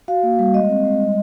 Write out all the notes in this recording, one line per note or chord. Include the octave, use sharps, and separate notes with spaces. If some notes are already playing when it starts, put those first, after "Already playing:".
F#4 F5
A#3
G3
G#3 D#5
C4
G#3
G3